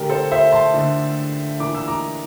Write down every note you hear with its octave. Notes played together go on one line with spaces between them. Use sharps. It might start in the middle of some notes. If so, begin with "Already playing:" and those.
Already playing: D3 A3 D4 G4 A#4
A4 C5
C5 E5
A5 C6
D3 A3 D4
E3 A#3 D4 D6
E6
A#5 D6